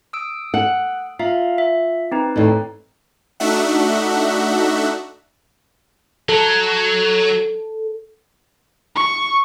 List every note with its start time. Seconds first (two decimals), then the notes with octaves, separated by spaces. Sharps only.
0.13 D#6 E6 D7
0.54 F#5
1.19 F4 E5 F5 A#5
1.58 E5
2.12 C4 D#4 B4
2.36 D#2 A2
3.40 A3 D4 D#4 F#4 E5 F#5
6.29 F#3 A4
8.96 C#6